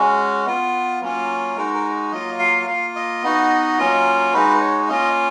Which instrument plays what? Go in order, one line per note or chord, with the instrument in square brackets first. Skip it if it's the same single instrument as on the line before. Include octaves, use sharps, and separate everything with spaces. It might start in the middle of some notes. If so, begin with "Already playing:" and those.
Already playing: [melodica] G#3 C#4 F#4
B3 F4
F#3 A#3 C#4 F4
G#3 D#4 F#4 A#4
A#4
F#3 A#3 F4 D#5
F5
A#3 F4 F5
D#5
B3 D#4 F#4
F#3 A#3 C#4 F4
G#3 D#4 F#4 B4
C#5
A#3 C#4 F4 D#5